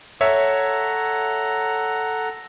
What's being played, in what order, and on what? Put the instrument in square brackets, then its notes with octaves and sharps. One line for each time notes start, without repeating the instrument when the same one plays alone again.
[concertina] A4 F#5 A#5 [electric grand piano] C#5 E5